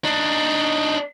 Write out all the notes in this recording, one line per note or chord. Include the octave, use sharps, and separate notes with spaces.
D4 D#4